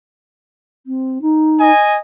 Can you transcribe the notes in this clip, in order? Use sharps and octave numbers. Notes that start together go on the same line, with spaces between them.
C4
D#4
D#5 G#5